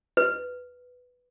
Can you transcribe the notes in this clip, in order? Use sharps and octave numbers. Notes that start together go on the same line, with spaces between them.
B4